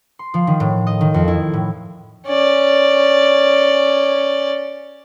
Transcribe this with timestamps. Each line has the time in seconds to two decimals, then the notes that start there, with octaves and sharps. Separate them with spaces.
0.19 C6
0.34 F3
0.47 D#3
0.60 A2
0.87 D#5
1.01 D#3
1.14 F2
1.28 E4
1.53 A2
2.27 C#4 D5